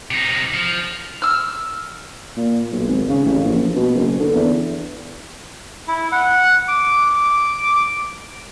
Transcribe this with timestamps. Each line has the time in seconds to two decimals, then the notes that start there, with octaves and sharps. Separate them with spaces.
0.11 C3 D#4
0.54 F3
1.22 E6 F6
2.37 A#2
2.72 B1
2.87 G#1
3.09 C#3
3.25 A1
3.44 A#1
3.76 B2
3.95 F#1
4.20 D3
4.35 E2
5.88 E4
6.12 F#5
6.68 D6